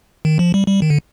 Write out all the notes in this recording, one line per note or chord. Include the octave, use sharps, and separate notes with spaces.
D#3
F3
G3
G3
D#3
D3